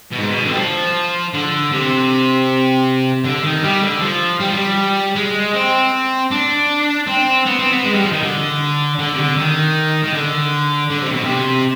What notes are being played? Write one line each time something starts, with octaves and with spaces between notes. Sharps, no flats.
B2
G#2
B2
D3
G3
F3
D3
C3
D3
D#3
G3
D3
F3
G3
F3
G3
G#3
C4
D4
C4
B3
C4
B3
G#3
G3
F3
D#3
D3
D3
C3
D3
D#3
D#3
D3
D3
C3
B2
C3